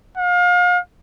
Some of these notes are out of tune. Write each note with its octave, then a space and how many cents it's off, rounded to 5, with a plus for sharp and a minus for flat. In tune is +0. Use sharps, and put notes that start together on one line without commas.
F5 +35